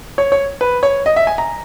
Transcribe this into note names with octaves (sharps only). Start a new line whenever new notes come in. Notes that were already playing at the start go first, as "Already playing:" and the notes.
C#5
C#5
B4
C#5
D#5
E5
G#5
A#5